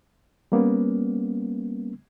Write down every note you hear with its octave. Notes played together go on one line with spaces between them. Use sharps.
G3 A#3 B3 C#4